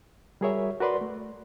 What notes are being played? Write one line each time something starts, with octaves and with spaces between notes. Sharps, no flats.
G3 F#4 G#4 A#4 C#5 E5
F#4 A#4 B4 D5 C6
A3